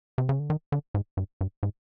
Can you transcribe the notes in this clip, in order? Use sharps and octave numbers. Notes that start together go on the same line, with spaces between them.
C3
C#3
D3
D#3
D3
G#2
G2
G2
G#2